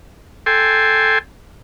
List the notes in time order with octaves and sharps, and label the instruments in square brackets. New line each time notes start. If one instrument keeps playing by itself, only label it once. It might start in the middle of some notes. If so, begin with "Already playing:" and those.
[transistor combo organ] A4 G5 G#5 C6